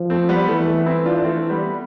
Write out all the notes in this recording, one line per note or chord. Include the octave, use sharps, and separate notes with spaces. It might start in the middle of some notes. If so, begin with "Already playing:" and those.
Already playing: F3
A3 C4
G3 B3
E3 A3
A3
C4 E4
D4 F4
D4
E3 A3 C4
G3 B3